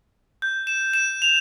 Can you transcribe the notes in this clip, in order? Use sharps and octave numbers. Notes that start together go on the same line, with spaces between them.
G6
E7
E7
F7